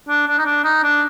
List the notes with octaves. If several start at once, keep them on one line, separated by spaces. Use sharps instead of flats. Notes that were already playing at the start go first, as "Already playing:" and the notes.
D4
D4
D#4
D4
D#4
D4